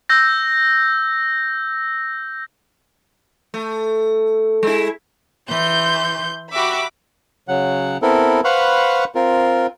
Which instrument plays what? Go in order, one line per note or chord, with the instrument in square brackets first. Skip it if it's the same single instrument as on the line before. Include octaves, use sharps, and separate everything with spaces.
[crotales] E6 G6 A#6
[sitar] A3
G#3 E4
[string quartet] E3 C6 [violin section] G6
[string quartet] F#4 G4 E5 [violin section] B5 D6
[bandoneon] C#3 F#3 F#5
B3 C4 E4 A4 A#4
B4 C5 F5 F#5 B5 C#6
C4 F4 A#4